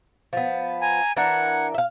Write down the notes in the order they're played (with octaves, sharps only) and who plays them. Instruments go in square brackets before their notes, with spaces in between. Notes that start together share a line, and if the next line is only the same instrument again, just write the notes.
[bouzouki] F3 B3
[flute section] G#5 A#5
[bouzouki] E3 D4 A#4 [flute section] F#5 G#6
[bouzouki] E5 F5